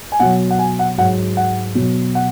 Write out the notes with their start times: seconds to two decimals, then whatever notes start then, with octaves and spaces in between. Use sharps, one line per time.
0.12 G#5
0.20 B2 F#3 F#5
0.50 F#5
0.59 G#5
0.79 F#5
0.98 G#2 F#3 F#5
1.37 F#5
1.75 B2 F#3
2.15 F#5